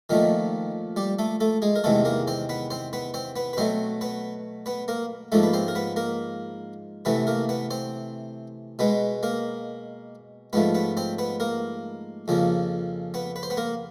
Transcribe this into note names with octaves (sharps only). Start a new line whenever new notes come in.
A#2 D#3 F3 A3 D#4
G3 G4
A3 A4
A3 A4
G#3 G#4
A#4
E2 C3 D#3 G#3 A3 B3 A4
A#3 A#4
C4 C5
B3 B4
C4 C5
B3 B4
C4 C5
B3 B4
B4
B2 F#3 A3 C4 C5
B3 B4
B3 B4
A#3 A#4
G#2 F3 A3 A#3 A4
B4
C4 C5
A#4
B3 B4
A#3 A#4
C3 E3 A3 B3 B4
A#3 A#4
B3 B4
C4 C5
B2 G#3 B3 B4
A#3 A#4
G#2 F3 A3 B3 B4
B3 B4
C4 C5
B3 B4
A#3 A#4
F2 C#3 F3 A#3
B3 B4
B4
C5
B3 B4
A#3 A#4